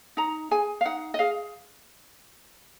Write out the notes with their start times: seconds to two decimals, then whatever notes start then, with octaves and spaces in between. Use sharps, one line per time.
0.17 D#4 A#5
0.51 G#4 G#5
0.81 F5
0.85 D#4 F#5
1.14 D#5
1.19 G#4 F5